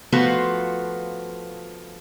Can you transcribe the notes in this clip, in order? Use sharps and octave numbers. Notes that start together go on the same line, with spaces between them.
F3 A3 B3 F4 F#4